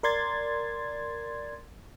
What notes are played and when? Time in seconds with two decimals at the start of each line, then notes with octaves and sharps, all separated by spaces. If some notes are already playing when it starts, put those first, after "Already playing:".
0.03 A#4 D5 C6 G#6 A6